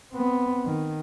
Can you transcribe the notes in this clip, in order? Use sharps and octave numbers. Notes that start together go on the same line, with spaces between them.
B3 C4
D#3